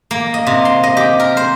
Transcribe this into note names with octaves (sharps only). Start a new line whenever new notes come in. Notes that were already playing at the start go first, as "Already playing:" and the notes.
A#3
D#5
C3
C6
D#5
G4
A#4
C5